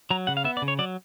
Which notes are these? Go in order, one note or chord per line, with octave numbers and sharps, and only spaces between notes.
F#3 A#5
C#3 F#5
F5
B3 E5
D5
C#3
C#5
F#3 D5